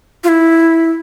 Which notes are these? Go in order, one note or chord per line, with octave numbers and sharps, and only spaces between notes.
F4
E4